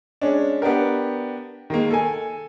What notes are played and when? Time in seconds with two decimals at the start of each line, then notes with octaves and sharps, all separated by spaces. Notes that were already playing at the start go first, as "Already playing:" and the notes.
0.21 G#3 C#4 D4
0.62 B3 D4 G4 A#4
1.70 D#3 G#3 A#3
1.91 A4 G#5